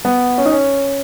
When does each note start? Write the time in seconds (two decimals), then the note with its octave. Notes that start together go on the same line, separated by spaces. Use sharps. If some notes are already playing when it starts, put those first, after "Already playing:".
0.05 B3
0.38 C#4
0.45 D#4
0.51 C#4